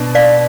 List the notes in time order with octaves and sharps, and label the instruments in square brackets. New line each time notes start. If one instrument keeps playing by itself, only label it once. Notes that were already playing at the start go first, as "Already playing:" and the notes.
Already playing: [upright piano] B2 D4
[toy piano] D5 F5